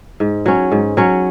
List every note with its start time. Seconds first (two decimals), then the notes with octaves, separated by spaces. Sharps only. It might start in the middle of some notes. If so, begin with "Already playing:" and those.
0.20 G#2
0.46 F#3 C#4
0.72 G#2
0.97 F#3 C#4